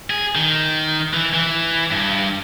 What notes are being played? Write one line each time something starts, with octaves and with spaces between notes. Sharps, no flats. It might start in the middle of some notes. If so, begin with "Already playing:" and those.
G#4
D#3
E3
E3
G2